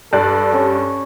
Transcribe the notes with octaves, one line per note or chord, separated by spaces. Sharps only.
G2 A4 D5 F#6
G3 C#4 C#5